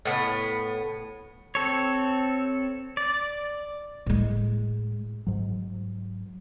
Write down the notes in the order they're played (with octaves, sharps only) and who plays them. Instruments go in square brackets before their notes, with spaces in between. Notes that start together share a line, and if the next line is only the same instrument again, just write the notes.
[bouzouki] A2 B3
[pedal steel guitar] C4 A4 C#5
D5
[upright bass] A2 G#3
[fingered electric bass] G#2 F#3